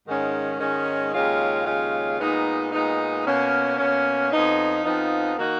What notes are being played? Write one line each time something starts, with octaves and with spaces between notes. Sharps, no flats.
G#2 D#3 G#3 C#4
G#2 D#3 G#3 C#4
D#2 C#3 G#3 C#4 F4
D#2 C#3 G#3 C#4 F4
A#2 G#3 B3 D#4
A#2 G#3 B3 D#4
B2 A#3 C#4
B2 A#3 C#4
F2 F3 B3 D#4
F2 F3 B3 D#4
D#3 A#3 D#4 F#4